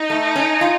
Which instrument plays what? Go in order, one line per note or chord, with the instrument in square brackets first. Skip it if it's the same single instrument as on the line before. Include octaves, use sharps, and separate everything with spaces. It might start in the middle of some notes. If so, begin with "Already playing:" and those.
Already playing: [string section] D#4
[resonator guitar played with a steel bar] A3
C#4
F4